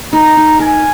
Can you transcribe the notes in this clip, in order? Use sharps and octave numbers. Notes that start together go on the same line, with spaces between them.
D#4 A#5
D#4
A#4 G#5